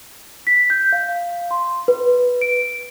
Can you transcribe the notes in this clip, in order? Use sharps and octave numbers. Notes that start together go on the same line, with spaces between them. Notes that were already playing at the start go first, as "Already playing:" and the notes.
B6
G6
F5
C6
B4
D7